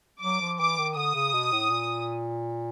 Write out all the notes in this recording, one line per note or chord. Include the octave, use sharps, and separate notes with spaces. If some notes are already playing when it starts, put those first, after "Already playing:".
F#3 D6
F3
E3 D6
D#3
D3 D#6
C#3
B2
A2
A#2